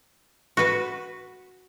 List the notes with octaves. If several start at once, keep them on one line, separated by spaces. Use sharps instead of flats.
F#4 B4